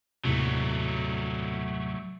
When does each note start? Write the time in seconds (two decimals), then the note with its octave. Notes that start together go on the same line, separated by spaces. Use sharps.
0.25 D#2 A2 C3 F#3 A3